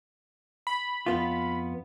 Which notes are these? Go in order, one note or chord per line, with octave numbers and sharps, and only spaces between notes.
B5
F2 B3 F4